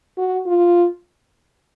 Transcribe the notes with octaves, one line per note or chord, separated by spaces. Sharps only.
F#4
F4